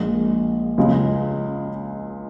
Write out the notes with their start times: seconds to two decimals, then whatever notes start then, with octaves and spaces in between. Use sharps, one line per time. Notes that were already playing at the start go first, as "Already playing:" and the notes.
Already playing: A#1 A#2 G#3
0.78 C#2 C#3 G#3